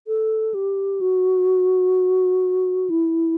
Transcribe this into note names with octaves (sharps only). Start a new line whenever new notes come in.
A4
G4
F#4
E4